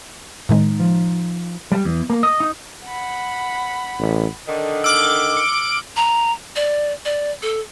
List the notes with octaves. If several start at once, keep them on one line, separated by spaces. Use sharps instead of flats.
A2 D#3 G#3 D#4
F3 A6
G3
E2
A#3
D#5
D#4
F#5 B5
A1
D3 D#3
D6 E6 F6 D7 F#7
C#7
A#5
D5
D5
A4